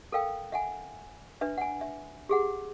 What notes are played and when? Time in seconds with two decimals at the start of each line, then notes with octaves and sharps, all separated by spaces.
0.12 A4 A#4 F5 G5
0.52 E5 F#5 G#5
1.41 D4 B4 E5
1.58 F#5 G#5
1.81 E5
2.29 G4 G#4 F#5